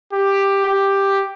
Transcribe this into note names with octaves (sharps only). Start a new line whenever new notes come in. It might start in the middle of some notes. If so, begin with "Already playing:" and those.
G4
G4